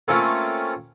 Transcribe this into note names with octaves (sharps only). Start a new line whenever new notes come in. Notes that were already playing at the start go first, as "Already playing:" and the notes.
A3 A#3 C4 C#4 F4